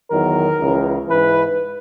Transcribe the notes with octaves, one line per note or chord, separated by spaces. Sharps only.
E2 D#3 F#3 A#4
C#2 C#3 E3
G#2 E3 B4